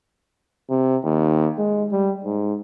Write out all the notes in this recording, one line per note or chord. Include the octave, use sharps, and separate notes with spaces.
C3
D#2
G#3
G3
G#2